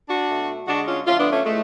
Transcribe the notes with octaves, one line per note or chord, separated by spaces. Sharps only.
D4 F#4
B2 A3
D3 G#3 D4 F#4
C#4 F4
D3 F3 A3 C#4 F4
B3 D4
A3 C#4
A2 G#3 A3